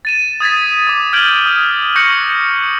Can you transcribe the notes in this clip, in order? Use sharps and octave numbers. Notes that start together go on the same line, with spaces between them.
A6 D#7 E7
D#6 G#6 A6 B6
D6 D#6
F6 G6 G#6 D7 F#7
D#6
C#6 F#6 G6 A#6 C#7 F#7